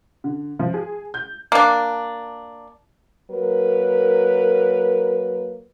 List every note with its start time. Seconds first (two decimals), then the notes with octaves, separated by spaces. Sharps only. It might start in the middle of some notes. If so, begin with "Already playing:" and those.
0.24 D3
0.59 F3
0.74 G#4
1.14 G6
1.52 A#3 D4
3.31 F#3 A#3 A#4 B4